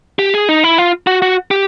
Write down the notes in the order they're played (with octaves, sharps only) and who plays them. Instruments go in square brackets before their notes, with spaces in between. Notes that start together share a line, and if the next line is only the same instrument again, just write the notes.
[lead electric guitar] G4
G#4
D#4
E4
F4
F#4
F#4
G4